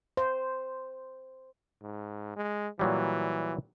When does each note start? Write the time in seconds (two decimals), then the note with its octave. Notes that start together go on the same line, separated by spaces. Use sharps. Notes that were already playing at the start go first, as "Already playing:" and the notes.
0.17 C5
1.82 G#2
2.36 G#3
2.79 A#2 E3 F#3 G3